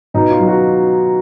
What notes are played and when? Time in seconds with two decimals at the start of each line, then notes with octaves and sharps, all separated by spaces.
0.14 B2 D#4
0.31 F4
0.39 F#3
0.48 F#4